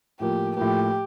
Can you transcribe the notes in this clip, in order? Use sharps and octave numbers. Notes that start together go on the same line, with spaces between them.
A2 F3 A#3 G4
A2 F3 A#3 G4